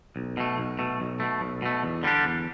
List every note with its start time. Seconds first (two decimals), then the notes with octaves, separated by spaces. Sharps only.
0.16 B1
0.37 B2 A3
0.58 B1
0.79 B2 A3
1.00 B1
1.20 B2 A3
1.41 B1
1.62 B2 A3
1.83 E2
2.03 D3 G3 D4 G4
2.25 E2